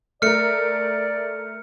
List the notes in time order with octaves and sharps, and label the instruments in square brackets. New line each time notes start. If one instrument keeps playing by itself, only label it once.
[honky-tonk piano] A3 A#4 [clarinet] D5 [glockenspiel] F6 C#7